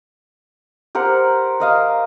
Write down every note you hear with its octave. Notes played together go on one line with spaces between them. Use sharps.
G4 A#4 C5 F#5
A#4 D#5 F5